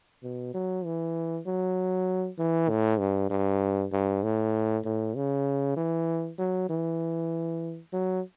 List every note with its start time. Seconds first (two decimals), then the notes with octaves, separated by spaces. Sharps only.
0.23 B2
0.54 F#3
0.85 E3
1.47 F#3
2.39 E3
2.69 A2
2.99 G2
3.30 G2
3.92 G2
4.23 A2
4.85 A2
5.16 C#3
5.76 E3
6.38 F#3
6.69 E3
7.93 F#3